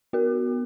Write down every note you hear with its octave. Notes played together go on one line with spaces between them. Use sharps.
B3 F#4 A#4